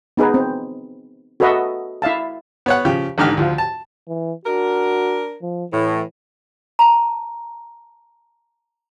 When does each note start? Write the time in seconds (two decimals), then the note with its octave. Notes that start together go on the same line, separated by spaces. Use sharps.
0.17 B3 D#4 G#4 B4
0.34 C4
1.40 F#4 A4 B4 D#5 E5 F#5
2.02 E4 E5 F5 A5
2.66 B3 C#5 F#5
2.85 C#3 F3 G4
3.18 A1 G#2 D3 D#4 G4 F6
3.37 D2 F3 F4
3.58 A5
4.08 E3
4.45 D4 F#4 A#4
5.42 F3
5.72 A2 E3
6.79 A5 A#5